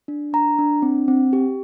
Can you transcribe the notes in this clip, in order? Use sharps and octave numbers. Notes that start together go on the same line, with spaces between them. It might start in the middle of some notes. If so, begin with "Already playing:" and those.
D4
D4 A#5
D4
C4
C4
G4